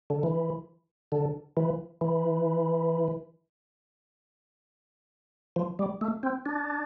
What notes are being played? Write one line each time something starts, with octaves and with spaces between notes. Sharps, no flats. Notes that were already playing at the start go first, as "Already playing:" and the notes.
D3
E3
D3
E3
E3
F3
G3
A3
C4
D4